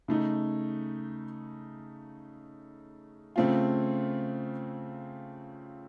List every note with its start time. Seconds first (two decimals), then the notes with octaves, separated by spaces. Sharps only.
0.08 C#3 A3 D#4
3.36 C#3 A3 C4 F4